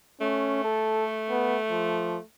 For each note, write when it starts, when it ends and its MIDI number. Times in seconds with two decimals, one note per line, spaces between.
0.21 2.22 57
0.21 0.63 61
0.64 1.06 69
1.30 1.58 59
1.70 2.18 53